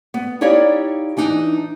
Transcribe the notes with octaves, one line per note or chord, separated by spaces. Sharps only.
B3
D#4 E4 G4 C#5 D5 F5
E3 D4 D#4